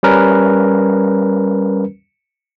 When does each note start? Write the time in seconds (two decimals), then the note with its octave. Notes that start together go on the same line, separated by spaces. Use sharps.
0.03 G3 C#4 A#4 B4